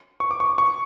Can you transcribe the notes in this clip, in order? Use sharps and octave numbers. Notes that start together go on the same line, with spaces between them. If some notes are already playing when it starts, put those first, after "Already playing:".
C#6
D6
C#6
C#6